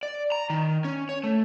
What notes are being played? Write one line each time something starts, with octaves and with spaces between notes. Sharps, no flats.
D5
A#5
D#3
C#4
C#5
A3